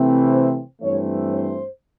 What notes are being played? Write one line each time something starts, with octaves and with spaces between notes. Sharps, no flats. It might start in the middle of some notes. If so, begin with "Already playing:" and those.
Already playing: C3 E3 A3 C4
C5
G2 E3 A3 C4 C#5
C5